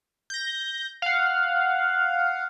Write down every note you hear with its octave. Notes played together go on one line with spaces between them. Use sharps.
G6 A#6
F5 F#5